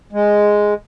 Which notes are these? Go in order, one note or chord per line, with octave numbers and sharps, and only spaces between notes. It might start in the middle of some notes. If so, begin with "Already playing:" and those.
G#3